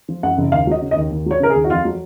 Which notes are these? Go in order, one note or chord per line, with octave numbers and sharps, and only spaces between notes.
F3
F#2 F#5
F#1
D#2 F5
F#3 D#5
C#3
D#5
D#2
D#2
F#3 C#5
C#3 A#4
G#4
D#2
F#4
F2 F4
F#3